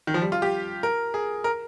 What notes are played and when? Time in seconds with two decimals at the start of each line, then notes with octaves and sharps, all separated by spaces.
0.07 D#3
0.14 F3
0.22 G3
0.32 F4
0.42 G4
0.83 A#4
1.14 G#4
1.44 A#4